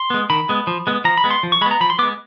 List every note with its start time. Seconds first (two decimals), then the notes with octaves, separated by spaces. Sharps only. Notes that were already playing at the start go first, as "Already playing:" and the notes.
Already playing: C6
0.10 G#3 B3
0.30 D#3 B5
0.49 G#3 B3
0.67 F3
0.87 G#3 B3
1.04 F3 A#5
1.17 B5
1.24 G#3 B3
1.31 C6
1.43 F3
1.52 C#6
1.61 G#3 B5
1.66 B3
1.71 A#5
1.81 F3 B5
1.90 C6
1.99 B3 D6
2.03 G#3